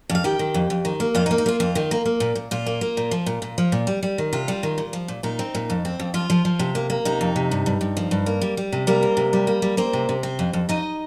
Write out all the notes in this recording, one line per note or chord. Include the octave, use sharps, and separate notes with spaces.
F2
F5
D#3 G4 G5
D#3
F2
F2
D#3
A#3
F2 F4 F5
D#4
A#3
D#4
A#3 F4
F2 F4
D#3
A#3
A#3
A#2
A#2
A#2 F4
A#3
A#3
A#2
F3
A#2
A#2
F3
A#2
G3
G3
D#3
C3 F4
G3
D#3
A#2
F3
A#2
A#2 D#4
C4
A#2
F2
C4
F2
F3 F4
F3
F3
C3
A#3
A#3
C3 D#4
F2
C3
G2
G2
G2
F3
G2
A#3
G3
G3
C3
G3 A#3 A#4
C4
C3
G3
A#3
G3
A#3 C4 C5
C3
C3
C4
F2
F2
F2 D#4 D#5